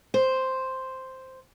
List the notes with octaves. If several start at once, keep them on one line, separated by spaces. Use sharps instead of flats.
C5